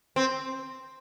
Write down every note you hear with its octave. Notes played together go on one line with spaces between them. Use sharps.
C4